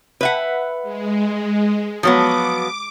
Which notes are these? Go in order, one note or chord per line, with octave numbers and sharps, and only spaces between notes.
B4 E5 F#5
G#3
F3 F#3 B3 D6